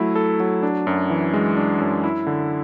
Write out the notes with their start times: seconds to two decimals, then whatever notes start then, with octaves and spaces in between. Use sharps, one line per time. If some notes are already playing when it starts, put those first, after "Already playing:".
Already playing: F#3 A3 E4
0.16 A4
0.40 F#3
0.63 D4
0.87 F#2
1.10 E3
1.34 G#3
1.57 D4
1.80 F#2
2.04 E4
2.26 D3